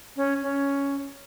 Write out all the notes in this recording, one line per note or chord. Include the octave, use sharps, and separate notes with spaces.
C#4
C#4